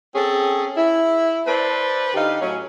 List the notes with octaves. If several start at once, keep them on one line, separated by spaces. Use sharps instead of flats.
C4 C#4 G#4 A4
E4
A4 B4 C5 D5
D3 D#4 G4 F5
A2 F#3 C#4